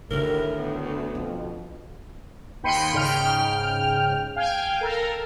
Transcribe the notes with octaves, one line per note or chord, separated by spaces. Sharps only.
D2 A2 D3 D#3 A#4
B3
F2 B2 F3
D#2 G5 B5 C6 C#7 D#7
G#2 C#3 G5 F6
F5 G5 G#5
A4 A#4